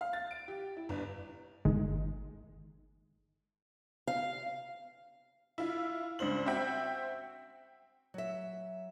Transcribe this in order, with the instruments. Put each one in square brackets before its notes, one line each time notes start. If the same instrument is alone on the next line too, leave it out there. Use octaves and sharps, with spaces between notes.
[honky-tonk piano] F5
A6
D7
G4
E4
G1
[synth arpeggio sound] G1 D#3 G#3
[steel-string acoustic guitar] F5
[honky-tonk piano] E4 F4
C#2 G2 C5 F#7
C4 F#4 E5 G5
[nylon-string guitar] F#3 E5